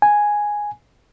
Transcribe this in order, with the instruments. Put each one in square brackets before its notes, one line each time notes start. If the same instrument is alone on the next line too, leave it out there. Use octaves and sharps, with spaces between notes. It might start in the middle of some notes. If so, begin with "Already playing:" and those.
[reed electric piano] G#5